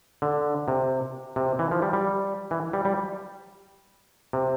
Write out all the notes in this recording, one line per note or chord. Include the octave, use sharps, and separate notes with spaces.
D3
C3
C3
E3
F3
G3
G3
E3
G3
G3
C3